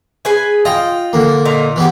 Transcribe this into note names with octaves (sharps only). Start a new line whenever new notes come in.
G#4 B4 G#5
F4 D#5 G5
D3 A#3
A#2 D#4 A#5
E3 B3 G4